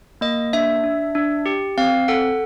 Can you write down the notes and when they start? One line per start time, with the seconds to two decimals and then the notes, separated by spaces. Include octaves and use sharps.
0.21 A#3 D#5
0.53 D4 E5
0.84 D4
1.15 D4
1.46 G4
1.78 C4 F5
2.08 A4 F#5